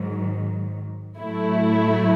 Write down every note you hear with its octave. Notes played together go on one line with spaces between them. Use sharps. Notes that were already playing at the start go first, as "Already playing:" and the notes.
Already playing: G#2 D#3 F#3
A2 F#3 A3 E4